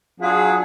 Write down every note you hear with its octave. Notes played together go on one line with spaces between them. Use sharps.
F#3 D4 F4 G#4